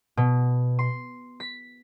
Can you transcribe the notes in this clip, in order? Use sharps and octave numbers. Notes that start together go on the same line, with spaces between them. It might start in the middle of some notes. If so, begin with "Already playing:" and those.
B2
C6
B6